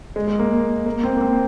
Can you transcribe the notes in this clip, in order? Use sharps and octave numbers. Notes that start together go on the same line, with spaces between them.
G#3
G#3
A#3
A#3
C4
A#3
C4